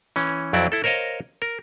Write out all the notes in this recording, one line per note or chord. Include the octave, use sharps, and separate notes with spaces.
E3 C#4
F2 F#3 C4 E4 D5
E4 A4
A#4 C5 C#5 D#5 F5
A#4